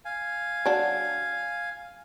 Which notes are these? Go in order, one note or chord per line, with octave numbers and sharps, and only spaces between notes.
F5 G#5
F#3 D4